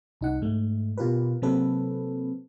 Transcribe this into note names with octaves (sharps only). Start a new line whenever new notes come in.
C2 D#4 F#5
G#2 G#3 A3
B2 F4 G4 A#4 B4
C3 F#3 A#3 C4 A4 B4